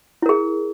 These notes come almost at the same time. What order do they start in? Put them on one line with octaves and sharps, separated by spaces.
E4 A#4 G#4